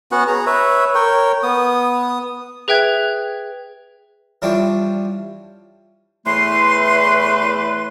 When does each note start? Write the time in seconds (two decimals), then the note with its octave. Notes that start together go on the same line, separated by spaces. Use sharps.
0.12 B3 C#4 F#4 F#5
0.28 G#4 A#5
0.47 B4 C#5 E5
0.95 A#4 C#5 G5
1.43 B3 D#6
2.68 G#4 B4 E5 G5 F#6 G#6
4.42 E3 F3 G3 D4 G4 C#5
6.25 E2 A2 E3 A3 B4 C6